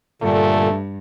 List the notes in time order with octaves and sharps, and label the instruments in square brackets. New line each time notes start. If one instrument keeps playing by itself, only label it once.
[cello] G2 [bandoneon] A#2 D3 [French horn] A3